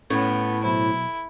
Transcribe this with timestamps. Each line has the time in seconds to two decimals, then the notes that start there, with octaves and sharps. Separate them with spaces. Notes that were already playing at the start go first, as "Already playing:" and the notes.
0.10 A2 B3 C#4
0.64 B2 F#3 E4 C5